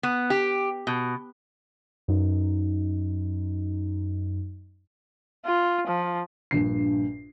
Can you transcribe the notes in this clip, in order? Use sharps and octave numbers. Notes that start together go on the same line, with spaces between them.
B3
G4
B2
F#2 D#4
F4
F3
A#1 G2 C7